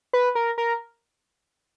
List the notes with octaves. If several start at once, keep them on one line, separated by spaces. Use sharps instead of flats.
B4
A#4
A#4